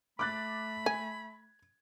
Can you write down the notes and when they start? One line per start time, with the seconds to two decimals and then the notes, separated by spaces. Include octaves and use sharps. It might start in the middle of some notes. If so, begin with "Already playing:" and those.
0.19 A3 B5 D6 F#6 A6
0.86 G#5 G#6